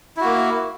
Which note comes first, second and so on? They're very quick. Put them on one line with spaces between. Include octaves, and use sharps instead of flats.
E4 F#4 A#3